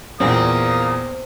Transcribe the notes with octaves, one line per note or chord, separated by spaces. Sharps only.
E2 A#2 A#3 C4 D#6